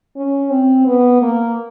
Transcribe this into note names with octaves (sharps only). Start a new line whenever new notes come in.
C#4
C4
B3
A#3